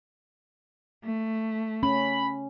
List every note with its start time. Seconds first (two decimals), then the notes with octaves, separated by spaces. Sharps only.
1.05 A3
1.83 C#4 B5